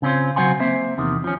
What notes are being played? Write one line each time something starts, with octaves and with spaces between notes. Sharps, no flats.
C#3 C4 C#4 F4 C5
C#3 F#3 C5 F#5 G#5 C6
A#3 C4 C5 E5
E2 C3 D#3
F3 C#4